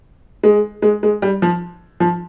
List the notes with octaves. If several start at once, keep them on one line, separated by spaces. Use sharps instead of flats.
G#3
G#3
G#3
G3
F3
F3